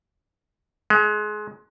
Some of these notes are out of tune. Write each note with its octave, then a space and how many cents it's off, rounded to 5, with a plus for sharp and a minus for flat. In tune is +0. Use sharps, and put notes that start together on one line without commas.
G#3 +25